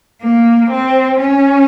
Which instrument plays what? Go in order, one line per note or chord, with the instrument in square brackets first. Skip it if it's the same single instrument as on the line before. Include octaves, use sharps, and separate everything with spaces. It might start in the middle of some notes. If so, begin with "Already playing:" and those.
[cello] A#3
C4
C#4